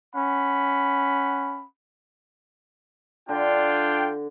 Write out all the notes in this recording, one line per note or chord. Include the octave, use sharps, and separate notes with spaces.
C#4 F#5 B5
D3 D4 F4 G5